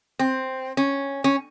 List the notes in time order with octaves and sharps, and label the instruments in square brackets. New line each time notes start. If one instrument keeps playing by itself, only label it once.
[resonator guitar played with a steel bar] C4
C#4
C#4